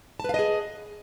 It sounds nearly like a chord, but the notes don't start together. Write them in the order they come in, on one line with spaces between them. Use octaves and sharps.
A5 B4 F5 D#5 G#4